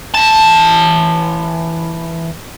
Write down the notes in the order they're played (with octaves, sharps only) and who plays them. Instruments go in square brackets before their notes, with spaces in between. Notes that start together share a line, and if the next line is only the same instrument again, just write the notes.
[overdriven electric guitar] E3 A5